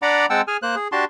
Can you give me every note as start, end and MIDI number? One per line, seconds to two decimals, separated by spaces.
0.02 0.26 62
0.02 0.26 74
0.02 0.26 78
0.02 0.26 82
0.02 0.26 83
0.02 0.26 86
0.30 0.42 56
0.30 0.42 60
0.30 0.42 78
0.30 0.42 79
0.30 0.42 81
0.30 0.42 88
0.48 0.57 68
0.48 0.57 80
0.48 0.57 89
0.62 0.75 58
0.62 0.75 72
0.62 0.75 90
0.76 0.88 68
0.92 1.05 62
0.92 1.05 66
0.92 1.05 67
0.92 1.05 81
0.92 1.05 84